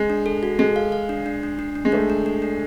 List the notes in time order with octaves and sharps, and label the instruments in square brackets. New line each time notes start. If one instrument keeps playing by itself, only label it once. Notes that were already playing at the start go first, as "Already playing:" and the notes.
Already playing: [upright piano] G#3
[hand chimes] D4
A4
F#4
[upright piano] G#3 [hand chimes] A4
[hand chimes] F5
F5
D4
D4
D4
D4
D4
[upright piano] G#3
[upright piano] A3 [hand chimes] D4
[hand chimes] D4
D4
D4